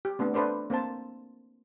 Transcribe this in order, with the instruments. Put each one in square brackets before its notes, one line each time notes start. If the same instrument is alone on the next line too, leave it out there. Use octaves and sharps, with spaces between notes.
[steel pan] G4
A3 B3 C4 D4
D4 A4 B4 C5 D5
A#3 C4 C5 A5